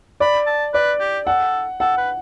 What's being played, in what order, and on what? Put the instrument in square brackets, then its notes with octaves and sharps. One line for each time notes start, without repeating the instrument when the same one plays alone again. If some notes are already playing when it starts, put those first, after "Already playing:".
[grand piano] D5 [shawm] B5
[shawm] A5
[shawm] B4 [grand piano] D5
[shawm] G4
[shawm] A4 [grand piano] F#5
[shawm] A4 [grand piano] F#5
[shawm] B4